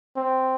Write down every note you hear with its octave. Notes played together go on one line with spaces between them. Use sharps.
C4